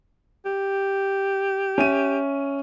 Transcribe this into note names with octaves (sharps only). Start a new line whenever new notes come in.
G4
C#4 E5 D#7